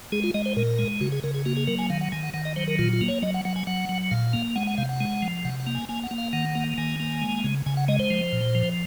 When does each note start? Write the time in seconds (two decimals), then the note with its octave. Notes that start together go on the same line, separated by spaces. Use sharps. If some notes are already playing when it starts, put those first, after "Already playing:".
0.12 G#3 G#4
0.24 F4
0.34 G#3 D#5
0.46 C5
0.56 A#2 A#4
0.79 G#3
1.01 C#3 F#4
1.12 G#4
1.23 C#3 A#4
1.34 G#4
1.45 A#3 F#4
1.57 G#4
1.67 F#3 A#4
1.79 G#5
1.90 D#3 F5
2.01 F#5
2.12 D#3 G#5
2.23 F#5
2.34 D#3 F#5
2.45 D#5
2.56 F#3 C5
2.68 A#4
2.79 A#2 F4
2.93 F4
3.01 A#3
3.08 C#5
3.22 F#3 D#5
3.34 F#5
3.45 F#3 F#5
3.56 G#5
3.67 F#3 F#5
3.89 F#3
4.11 A#2 F5
4.33 A#3
4.55 G#3 F#5
4.67 F#5
4.78 C3 F5
4.89 F#5
5.00 G#3
5.22 F3
5.45 C3 F#5
5.60 F#5
5.67 A#3
5.75 G#5
5.89 A#3 G#5
6.03 F#5
6.11 A#3
6.18 F5
6.33 D#3 F#5
6.55 A#3
6.78 D#3 G#5
7.00 A#3
7.22 G#3
7.44 C#3
7.66 C#3 G#5
7.77 F#5
7.88 G#3 D#5
8.00 C5
8.10 F3
8.33 A#2
8.55 F3